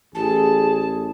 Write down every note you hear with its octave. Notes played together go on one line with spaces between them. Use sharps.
A1 G#4 A5